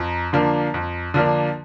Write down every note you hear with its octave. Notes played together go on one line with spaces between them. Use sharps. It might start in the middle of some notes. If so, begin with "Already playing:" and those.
Already playing: F2 A#5
D3 F3 A#3 D4
F2
D3 F3 A#3 D4